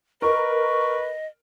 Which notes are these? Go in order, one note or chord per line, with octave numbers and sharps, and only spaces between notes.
A#4 B4 D#5 C#6